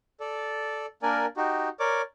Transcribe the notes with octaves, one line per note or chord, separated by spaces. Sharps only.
A4 D5
A#3 D4 A#4 D5 G#5
D#4 F#4 G4
A#4 C#5 D5 D6